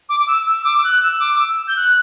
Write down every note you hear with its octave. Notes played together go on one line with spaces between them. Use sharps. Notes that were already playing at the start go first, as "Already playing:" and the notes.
D6
D6
E6
E6
D6
E6
F#6
E6
D6
E6
G6
F#6